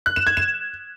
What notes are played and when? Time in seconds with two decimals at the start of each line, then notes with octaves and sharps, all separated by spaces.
0.06 F#6
0.16 E7
0.27 G#6
0.37 E7